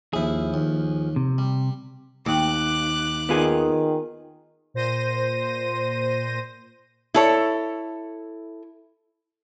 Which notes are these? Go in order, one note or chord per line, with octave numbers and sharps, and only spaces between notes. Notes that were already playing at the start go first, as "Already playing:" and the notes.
D#2 F3 E4 G#4
D#2
C3
G3
D#2 D6 F#6
D#3 B3 F4 G#4
A#2 C5 A#6 D#7
E4 A4 C#5